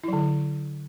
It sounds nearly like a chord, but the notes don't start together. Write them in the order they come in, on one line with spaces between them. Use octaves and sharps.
E4 F#3 D3